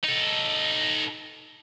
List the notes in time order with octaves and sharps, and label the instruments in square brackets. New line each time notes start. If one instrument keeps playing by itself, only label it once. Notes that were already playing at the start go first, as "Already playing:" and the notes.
[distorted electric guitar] D#4 A4